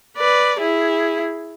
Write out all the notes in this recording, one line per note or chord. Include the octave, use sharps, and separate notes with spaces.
B4 D5
E4 G#4